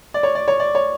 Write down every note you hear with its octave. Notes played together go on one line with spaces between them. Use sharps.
D5
C#5
D5
C#5
D5
C#5